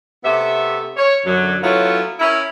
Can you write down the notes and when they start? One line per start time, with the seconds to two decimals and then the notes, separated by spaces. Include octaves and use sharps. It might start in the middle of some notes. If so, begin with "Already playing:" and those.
0.24 C3 A3 B3 G4 E5
0.97 C#5
1.25 F#2 D3 F#3
1.62 F#3 A3 B3 C#4 E4 F4
2.19 C#4 E4 A#4